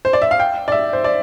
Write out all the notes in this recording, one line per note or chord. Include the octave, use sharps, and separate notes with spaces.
C5
D5
E5
F5
G5
D5
E5
C5
D5